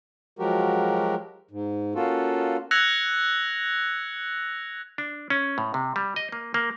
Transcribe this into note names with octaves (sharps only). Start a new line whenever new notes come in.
F3 F#3 G#3 F#4 G4 A#4
G#2
A#3 C#4 F4 F#4 A4
E6 F#6 G#6 A#6 C#7 F7
D4
C#4
A2
C3
G3
D#5
A#3
A#3